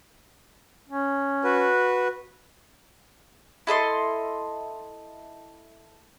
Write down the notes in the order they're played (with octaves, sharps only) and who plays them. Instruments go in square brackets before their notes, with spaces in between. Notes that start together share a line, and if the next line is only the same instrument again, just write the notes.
[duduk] C#4
[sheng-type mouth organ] F#4 B4
[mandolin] E4 A4 D#5 C6